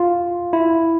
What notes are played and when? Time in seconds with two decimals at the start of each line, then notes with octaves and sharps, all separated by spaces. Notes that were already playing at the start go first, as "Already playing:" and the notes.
Already playing: F4
0.53 E4